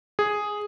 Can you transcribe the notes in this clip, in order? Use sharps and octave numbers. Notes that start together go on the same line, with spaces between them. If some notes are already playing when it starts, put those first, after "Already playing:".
G#4